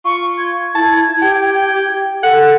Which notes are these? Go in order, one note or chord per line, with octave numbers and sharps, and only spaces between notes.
F4 C#6
G#6
E4 A5
G4 G5
A4 F#5 F#6